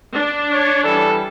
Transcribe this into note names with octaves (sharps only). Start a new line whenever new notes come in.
D4
C#5
E3 G3 A4